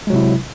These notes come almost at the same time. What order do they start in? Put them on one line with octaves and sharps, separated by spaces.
G#3 F#3 C3 E4